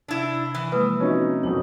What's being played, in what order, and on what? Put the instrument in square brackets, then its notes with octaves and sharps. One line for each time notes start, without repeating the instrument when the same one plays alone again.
[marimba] C3 E6 [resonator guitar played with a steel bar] D4 E4
[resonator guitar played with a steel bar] E3
[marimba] F3 G#3 A#3 [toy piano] B4 [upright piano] D#6
[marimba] C4 F#4 E5 [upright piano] C#4 D#4
[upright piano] F#1 F2 B2 [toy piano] C#5